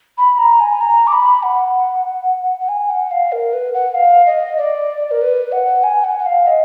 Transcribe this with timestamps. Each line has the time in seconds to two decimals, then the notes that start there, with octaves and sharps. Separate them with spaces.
0.18 B5
0.38 A#5
0.60 G#5
0.80 A#5
1.07 D6
1.12 B5
1.43 F#5
2.60 F#5
2.68 G#5
2.90 F#5
3.11 F5
3.32 A#4
3.53 B4
3.74 F#5
3.94 F5
4.26 D#5
4.58 D5
5.11 A#4
5.21 B4
5.52 F#5
5.83 G#5
6.04 F#5
6.19 F#5
6.26 F5
6.47 D#5